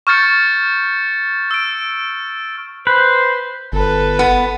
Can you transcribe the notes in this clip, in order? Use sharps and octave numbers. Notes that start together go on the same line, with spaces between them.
C#6 F6 G6 A6 C#7
E6 D7
B4 C5
G1 A4 B4
B3